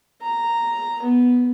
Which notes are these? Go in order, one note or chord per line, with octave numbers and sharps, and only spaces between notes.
A#5
B3